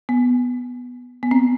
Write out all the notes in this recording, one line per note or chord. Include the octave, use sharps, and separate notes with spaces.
B3
B3
C4